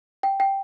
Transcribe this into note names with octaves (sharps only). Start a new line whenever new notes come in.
G5
G5